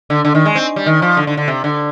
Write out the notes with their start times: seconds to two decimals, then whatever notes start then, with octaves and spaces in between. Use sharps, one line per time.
0.10 D3
0.25 D3
0.35 D#3
0.45 G#3
0.55 C4
0.76 G3
0.86 D#3
1.02 F3
1.17 D3
1.27 D3
1.37 D3
1.48 C3
1.64 D3